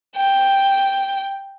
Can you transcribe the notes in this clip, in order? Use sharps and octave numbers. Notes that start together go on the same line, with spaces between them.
G5